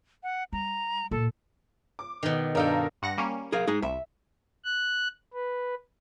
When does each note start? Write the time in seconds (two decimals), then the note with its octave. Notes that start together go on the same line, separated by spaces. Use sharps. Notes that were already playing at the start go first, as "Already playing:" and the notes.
0.23 F#5
0.53 G3 A#5
1.11 A#2 A4
1.99 D6
2.23 B2 D#3
2.55 G2 A4 A#4 D#5 F5 G5
3.02 G2 F#5 A#6
3.17 G3 A#3 C#4
3.52 G#4 A#4 F5
3.67 G#3 D#4 G#4
3.82 C2 E5
4.65 F#6
5.34 B4